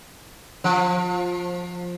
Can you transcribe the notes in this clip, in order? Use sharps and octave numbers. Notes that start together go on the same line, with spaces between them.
F3